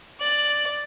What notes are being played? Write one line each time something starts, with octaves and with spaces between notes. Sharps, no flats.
D5 F#6